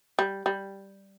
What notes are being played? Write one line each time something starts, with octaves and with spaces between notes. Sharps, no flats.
G3
G3